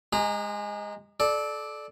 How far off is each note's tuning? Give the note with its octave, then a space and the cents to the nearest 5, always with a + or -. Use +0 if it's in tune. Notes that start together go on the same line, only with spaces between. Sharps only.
G#3 +0 G#4 -45 A#5 -5
A4 -25 D5 +10